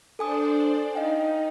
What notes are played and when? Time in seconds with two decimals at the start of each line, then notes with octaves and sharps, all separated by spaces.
0.19 D4 A4 C5 D5 G#5 D#6
0.95 D#4 D#5 F5 G5